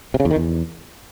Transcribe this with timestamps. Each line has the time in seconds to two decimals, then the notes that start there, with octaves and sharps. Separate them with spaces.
0.14 C3
0.20 C#3
0.25 E2
0.31 D#3
0.36 E2